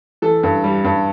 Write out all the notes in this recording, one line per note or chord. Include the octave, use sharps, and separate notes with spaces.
E3 A4
G2
G3
G2